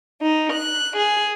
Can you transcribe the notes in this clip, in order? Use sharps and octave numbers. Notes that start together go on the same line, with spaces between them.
D#4
F#6
G#4